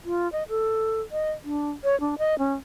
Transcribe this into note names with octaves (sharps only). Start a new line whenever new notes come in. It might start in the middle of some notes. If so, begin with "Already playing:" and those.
F4
D#5
A4
D#5
D4
C#5
D4
D#5
C#4